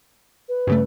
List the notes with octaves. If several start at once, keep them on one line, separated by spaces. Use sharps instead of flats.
B4
G2 C#3 A3